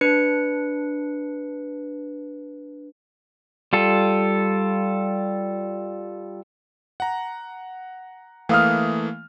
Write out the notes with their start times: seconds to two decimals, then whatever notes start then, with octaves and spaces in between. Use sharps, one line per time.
0.01 D4 B4 C#7
3.73 G3 F4 A4
7.00 F#5 A#5
8.49 E3 A3 A#3 F5 D#6 F6